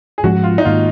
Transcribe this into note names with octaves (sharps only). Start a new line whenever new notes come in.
G#4
G#2 F3 G#3 C#4 F#4
F4
D#4
G#2 D#3 A#3 F4